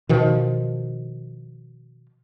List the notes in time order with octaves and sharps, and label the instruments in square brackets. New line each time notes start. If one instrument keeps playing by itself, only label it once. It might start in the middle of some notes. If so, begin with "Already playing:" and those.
[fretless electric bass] B2 D#3 F3